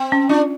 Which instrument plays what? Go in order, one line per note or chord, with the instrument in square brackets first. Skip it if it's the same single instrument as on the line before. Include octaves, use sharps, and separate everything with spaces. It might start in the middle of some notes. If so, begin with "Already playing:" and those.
Already playing: [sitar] C4
[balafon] C#4
[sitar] D4 [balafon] F4